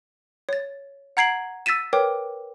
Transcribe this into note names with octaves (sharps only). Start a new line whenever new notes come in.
C#5 A6
F#5 A#5 G#6 C7 D7 F#7
E6 A6 B6 D#7 E7
A#4 B4 C#5 G5 D6